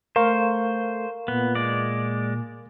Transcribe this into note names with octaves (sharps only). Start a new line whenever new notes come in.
A3 A#4 C5 F5 C#6
A#2 B3
G#3 D5